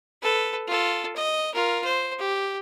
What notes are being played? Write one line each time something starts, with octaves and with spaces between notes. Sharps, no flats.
A4 B4
F4 A4
D#5
F4 A#4
C5
G4